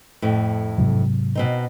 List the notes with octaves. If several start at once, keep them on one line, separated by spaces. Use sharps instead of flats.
F2 A2
G#2 C3 F#3
B2 C4 D#4